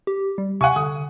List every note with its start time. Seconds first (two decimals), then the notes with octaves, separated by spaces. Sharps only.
0.07 G4
0.38 G3
0.61 C3 F#5 G#5 C#6
0.76 D3 D#6